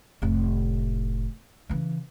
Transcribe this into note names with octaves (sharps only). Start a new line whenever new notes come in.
F1 A2
C#3 E3